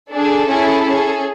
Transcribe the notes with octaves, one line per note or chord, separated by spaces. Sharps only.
D4 G#4 A4
C#4 E4 G#4
C#4 G#4